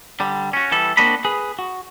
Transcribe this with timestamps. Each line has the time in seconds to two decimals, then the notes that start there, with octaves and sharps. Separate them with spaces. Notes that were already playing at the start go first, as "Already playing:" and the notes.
0.20 D3 G3
0.53 C#4 F#4
0.71 E3 G3 A4
0.97 A#3 C4 D4 F#4 D#5 B5
1.25 G#4 B4
1.59 F#4